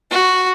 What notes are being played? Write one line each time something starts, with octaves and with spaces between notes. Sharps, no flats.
F#4